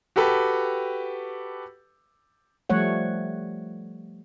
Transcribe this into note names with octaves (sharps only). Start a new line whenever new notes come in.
F#4 G4 A4 B4 G5
F3 G3 A3 C#5 F#5